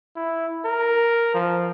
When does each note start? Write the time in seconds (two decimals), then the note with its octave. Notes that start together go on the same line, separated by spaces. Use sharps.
0.16 E4
0.65 A#4
1.34 F3